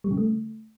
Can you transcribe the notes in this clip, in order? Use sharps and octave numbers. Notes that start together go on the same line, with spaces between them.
G3
C#3
A3